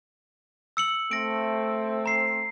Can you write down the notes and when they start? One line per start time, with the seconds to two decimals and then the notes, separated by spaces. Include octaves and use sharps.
0.77 E6 C#7 F#7
1.11 A3 C4 A#6 D7
2.06 A#5 C7